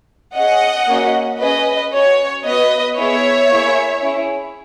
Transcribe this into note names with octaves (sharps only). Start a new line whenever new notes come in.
C#4 G#4 D#5 F#5
A#3 C#4 F#4
C#4 G#4 B4 D#5
C#4 F#4 C#5
B3 F#4 B4 D#5
B3 E4 G#4 C#5 E5
A#3 E4 G#4
C#4 E4 G#4